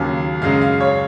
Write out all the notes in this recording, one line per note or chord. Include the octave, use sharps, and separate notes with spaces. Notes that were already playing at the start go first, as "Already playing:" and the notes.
Already playing: D#2 C#3 F#3
F#2 C#3 G#3 F5
F5
C#5